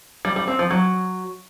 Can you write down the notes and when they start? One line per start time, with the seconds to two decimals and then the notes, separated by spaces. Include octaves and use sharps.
0.25 G3
0.36 G3
0.48 C4
0.59 F3
0.71 F#3